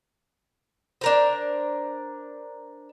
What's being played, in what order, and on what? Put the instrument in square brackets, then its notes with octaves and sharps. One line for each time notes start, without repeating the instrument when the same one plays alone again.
[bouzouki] D4 A#4 C5